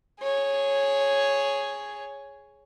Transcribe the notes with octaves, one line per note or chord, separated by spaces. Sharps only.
G#4 C#5